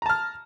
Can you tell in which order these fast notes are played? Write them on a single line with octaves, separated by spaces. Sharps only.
A#5 A5 F6